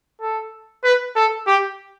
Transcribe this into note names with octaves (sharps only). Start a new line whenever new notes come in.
A4
B4
A4
G4